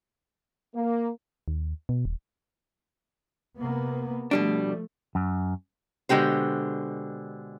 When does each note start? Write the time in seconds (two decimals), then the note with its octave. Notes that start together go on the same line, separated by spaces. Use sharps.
0.75 A#3
1.48 D#2
1.89 B2
2.05 D#1
3.59 C3 A#3 B3
4.31 B2 F3 G3 A3 D4
5.15 F#2
6.09 B2 D3 G#3 G4 C5